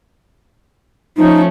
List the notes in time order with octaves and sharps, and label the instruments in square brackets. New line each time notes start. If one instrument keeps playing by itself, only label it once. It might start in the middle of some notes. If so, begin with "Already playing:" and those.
[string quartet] F3 A3 C#4 [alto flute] D#4